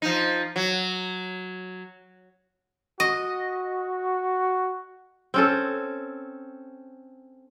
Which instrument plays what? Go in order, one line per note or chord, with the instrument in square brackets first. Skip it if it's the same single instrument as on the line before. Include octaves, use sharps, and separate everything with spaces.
[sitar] F3 D#4
F#3
[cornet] F#4 [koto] D#5
[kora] C4 C#4 A4